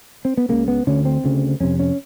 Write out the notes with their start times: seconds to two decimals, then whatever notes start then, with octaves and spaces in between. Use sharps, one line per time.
0.25 C4
0.37 B3
0.49 C#2 C#3 A#3
0.68 B3
0.87 D2 D3 C#4
1.05 C4
1.24 D2 C#3
1.60 F2 C3 C#4
1.79 C#4